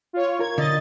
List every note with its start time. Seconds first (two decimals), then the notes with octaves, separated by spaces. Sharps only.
0.13 F4 C#5
0.39 F4 A#4 G#6
0.58 D3 D#5 A6